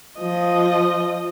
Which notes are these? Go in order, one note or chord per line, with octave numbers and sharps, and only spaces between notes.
F3 D#5